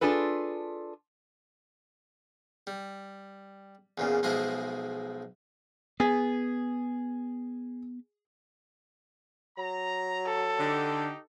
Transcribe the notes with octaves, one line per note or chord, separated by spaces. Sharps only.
D4 F4 G#4 A4 B4
G3
E2 A#2 C#3
B1 F3 G#3 E4 D#5
B3 G#4
F#3 A#5
A4
D3 D#4 G4